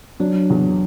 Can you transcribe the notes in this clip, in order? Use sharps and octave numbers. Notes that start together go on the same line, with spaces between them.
F#3 D4
E2